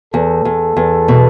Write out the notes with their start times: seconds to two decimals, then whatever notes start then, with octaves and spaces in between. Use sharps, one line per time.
0.14 E2 A4
0.45 E2
0.77 E2
1.08 B2